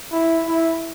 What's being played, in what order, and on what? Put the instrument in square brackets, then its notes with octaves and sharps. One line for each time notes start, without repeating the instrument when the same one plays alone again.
[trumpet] E4
E4